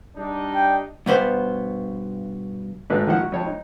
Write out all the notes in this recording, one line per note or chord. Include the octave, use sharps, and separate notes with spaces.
G3 D4 D#4
G5
G2 B2 B3 C5
G#1 G#2 A3 B4
D#3 F3 E4 F#5
F#4
F2 C#5 A5
D#4